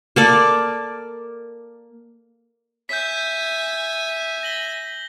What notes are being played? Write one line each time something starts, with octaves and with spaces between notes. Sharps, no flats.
A#3 A4 D5
E5 G#5 G6 B6
A#6 F#7 G7